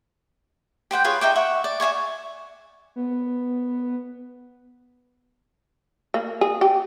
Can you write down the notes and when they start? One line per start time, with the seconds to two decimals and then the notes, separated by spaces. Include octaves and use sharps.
0.91 G4 C5 F#5 G5
1.04 F4 G#4 B4 C#5
1.21 D#4 E5 G5 D6
1.36 E5 F#5 C#6
1.64 D5
1.80 E5 F5 G#5 C#6
2.96 B3
6.14 A#3
6.41 G#4
6.61 G4